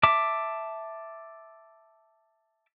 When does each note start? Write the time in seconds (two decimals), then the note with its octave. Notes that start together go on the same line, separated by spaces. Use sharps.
0.03 E5 A5 D6